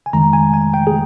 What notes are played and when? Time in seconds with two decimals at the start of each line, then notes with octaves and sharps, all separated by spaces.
0.06 G#5
0.13 F2 D#3 G#3 A#5
0.33 G#5
0.54 G#5
0.74 G5
0.87 G#4